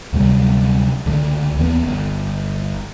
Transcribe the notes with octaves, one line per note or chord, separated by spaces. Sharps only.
D2 C3 F#3 G3
C#2 D3
D#2 E3 B3
G1